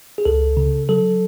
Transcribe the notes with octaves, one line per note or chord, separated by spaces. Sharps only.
G#4
C#2 A4
C#3
F#3 A4